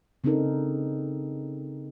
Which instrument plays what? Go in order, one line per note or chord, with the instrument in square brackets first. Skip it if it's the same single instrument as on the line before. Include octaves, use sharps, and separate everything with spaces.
[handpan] C#3 C4 D4 D#4 A4 A#4